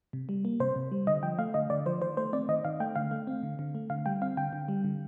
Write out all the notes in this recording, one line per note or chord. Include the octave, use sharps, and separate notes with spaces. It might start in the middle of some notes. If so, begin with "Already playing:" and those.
C3
G3
A#3
C3 C5
C3
G3
D3 D#5
F3 G5
A3 F5
D3 D#5
D3 D5
F3 C5
D#3 C5
A3 C5
C4 D5
D#3 D#5
D#3 F5
A3 G5
D3 F5
A3
C4
D3
D3
A3
D3 F5
G3 G5
C4 F5
D3 G5
D3
G3
D3